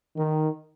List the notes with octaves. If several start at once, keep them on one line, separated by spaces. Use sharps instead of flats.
D#3